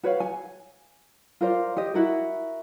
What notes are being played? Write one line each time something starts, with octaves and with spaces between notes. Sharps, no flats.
F#4 B4 C#5 F5
G#5
F4 A#4 C5 D5
G4 D#5
E4 F#4 A#4